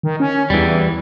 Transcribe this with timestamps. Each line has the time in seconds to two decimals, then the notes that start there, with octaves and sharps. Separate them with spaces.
0.03 D#3
0.20 C#4
0.50 E2 E3 G3